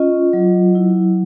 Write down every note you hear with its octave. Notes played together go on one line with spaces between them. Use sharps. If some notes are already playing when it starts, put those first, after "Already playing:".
Already playing: C#4 F4 D#5
F#3
E4